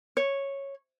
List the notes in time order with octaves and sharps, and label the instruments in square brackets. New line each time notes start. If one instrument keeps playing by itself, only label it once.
[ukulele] C#5